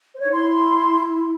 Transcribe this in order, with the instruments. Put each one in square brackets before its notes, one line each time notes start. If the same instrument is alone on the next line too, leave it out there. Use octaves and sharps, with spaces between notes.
[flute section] C5
C#5
[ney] D#4
[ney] E4 [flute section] C6